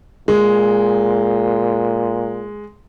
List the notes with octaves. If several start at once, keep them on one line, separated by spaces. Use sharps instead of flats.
A#2 G#3